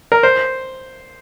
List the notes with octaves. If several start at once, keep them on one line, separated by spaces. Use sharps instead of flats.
A#4
C5